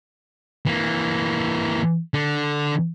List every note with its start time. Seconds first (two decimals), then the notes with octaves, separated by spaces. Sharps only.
0.66 E3 A#3
2.14 D3